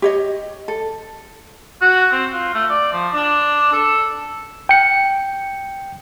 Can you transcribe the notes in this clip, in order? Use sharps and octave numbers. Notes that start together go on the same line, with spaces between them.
G4 C#5 D#5
A4
F#4
C4
F4
A3
D5
F3
D4
A4
G5 C#7